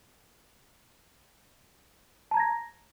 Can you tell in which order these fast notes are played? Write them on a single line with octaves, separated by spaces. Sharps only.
A5 A#5 G#6 A#6